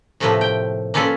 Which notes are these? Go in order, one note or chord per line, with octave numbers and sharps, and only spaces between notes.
A2 C3 F3 A3 A#3 B4
G5
A#3 C#4 F4 A4 B4